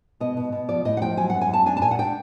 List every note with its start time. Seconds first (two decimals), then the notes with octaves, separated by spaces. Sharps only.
0.20 B2 D#5
0.37 B2
0.52 B2
0.69 F3 D5
0.85 A2 D#5
0.97 F#5
1.02 F3 G5
1.17 F#3 G#5
1.30 F#5
1.34 F#2
1.41 G#5
1.49 F#2 A5
1.66 D4 G#5
1.77 A5
1.81 A#2 G#5
1.91 F#5
1.99 D4 G5